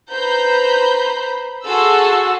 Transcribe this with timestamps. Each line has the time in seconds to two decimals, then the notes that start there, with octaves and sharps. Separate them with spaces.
0.11 B4 C5 A#5 B5 G6
1.67 F#4 G#4 A4 A5 C6 E6